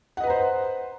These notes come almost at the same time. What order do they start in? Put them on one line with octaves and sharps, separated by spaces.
F#5 D#5 B4 A#5 C5